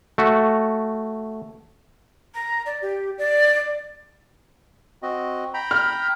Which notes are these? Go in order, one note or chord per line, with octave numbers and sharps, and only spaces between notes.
A3 F#4
A#5
D5
G4
D5
C4 F#4 D#5
G5 A#5 B5
F6